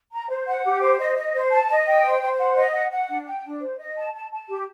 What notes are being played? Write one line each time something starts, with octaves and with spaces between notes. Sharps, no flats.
A#5
C5
F#5
G4
C5
D#5
D#5
C5
A5
D#5
G5
C5
C5
F#5
D#5
F#5
F#5
D4
G5
D4
C5
D#5
A5
A5
A5
G4